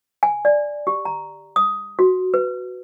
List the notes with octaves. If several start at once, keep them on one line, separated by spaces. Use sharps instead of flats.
G#5
D5
G4
A#5
D#6
F#4
B4